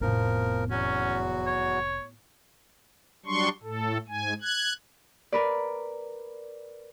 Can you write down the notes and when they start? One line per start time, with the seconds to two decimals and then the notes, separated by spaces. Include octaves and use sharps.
0.01 F1 F2 A2 F3 B3 A#4
0.70 E2 F#3 C#4 F#4
1.47 C#5
3.26 F#3 G3 D4 C6 C#6
3.63 A2 A4
4.08 G#2 G#5
4.41 F#6 G#6
5.32 A#4 B4 D5